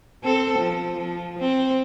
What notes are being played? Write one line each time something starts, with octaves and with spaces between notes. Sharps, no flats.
C4 A4
F3
F3
C4